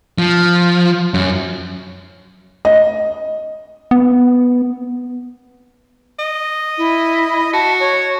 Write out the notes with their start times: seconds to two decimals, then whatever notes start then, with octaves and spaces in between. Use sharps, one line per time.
0.19 F3
1.14 F#2
2.65 D#5
3.91 B3
6.19 D#5
6.78 E4
7.53 F#4 A5
7.80 C#5